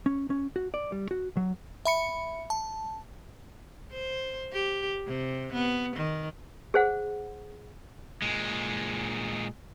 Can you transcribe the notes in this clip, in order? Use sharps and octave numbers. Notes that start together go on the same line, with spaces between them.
C#4
C#4
F#4
D5
G3
F#4
F#3
E5 B5 C#7
A5
C5
G4
C3
B3
D#3
G#4 C5 F#5
A#2 G#3